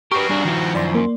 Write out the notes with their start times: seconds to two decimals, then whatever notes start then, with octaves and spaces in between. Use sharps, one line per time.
0.11 F#4 G4 A#4 B4 C#6 C7
0.29 G3 D4 G#4
0.45 D#3 F3 E4
0.75 F#2 D5 C6
0.95 A#3